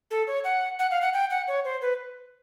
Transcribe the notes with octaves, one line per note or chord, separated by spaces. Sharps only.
A4
C#5
F#5
F#5
F5
F#5
G5
F#5
C#5
C5
B4